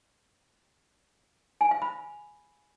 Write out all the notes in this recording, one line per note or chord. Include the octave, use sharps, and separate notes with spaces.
G#5
F5
B5